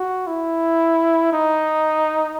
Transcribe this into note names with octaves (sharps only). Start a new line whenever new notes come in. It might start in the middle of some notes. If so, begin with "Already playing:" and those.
Already playing: F#4
E4
D#4